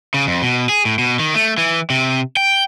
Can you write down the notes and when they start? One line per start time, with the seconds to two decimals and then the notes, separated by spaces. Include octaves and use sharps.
0.14 C#3
0.27 F2
0.42 B2
0.69 G#4
0.85 A2
0.98 B2
1.19 D#3
1.34 A3
1.58 E3
1.90 C3
2.37 G5